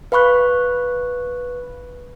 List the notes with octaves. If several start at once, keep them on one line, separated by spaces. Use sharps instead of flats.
B4 F5 B5 C#6 F#6